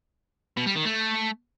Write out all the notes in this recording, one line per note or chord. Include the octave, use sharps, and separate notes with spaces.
B2
G3
D#3
A3